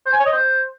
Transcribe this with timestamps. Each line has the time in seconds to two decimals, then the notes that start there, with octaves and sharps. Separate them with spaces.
0.07 C5
0.13 G#5
0.20 C#5
0.26 D#5
0.32 C5